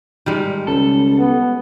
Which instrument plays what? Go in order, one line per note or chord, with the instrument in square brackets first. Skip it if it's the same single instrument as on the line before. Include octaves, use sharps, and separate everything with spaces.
[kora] D#3 G3 G#3
[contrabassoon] C#2 [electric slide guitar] A4
[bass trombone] B3